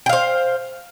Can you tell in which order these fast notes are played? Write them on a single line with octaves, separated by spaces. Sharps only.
G5 F5 C5